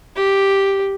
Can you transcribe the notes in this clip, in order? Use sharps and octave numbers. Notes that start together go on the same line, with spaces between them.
G4